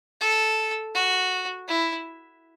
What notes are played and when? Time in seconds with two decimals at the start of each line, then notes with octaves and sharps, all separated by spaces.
0.21 A4
0.95 F#4
1.68 E4